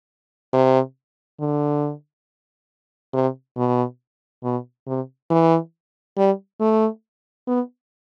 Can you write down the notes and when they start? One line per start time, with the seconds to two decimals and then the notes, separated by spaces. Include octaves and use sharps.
0.53 C3
1.40 D3
3.13 C3
3.57 B2
4.43 B2
4.87 C3
5.30 E3
6.17 G3
6.60 A3
7.47 B3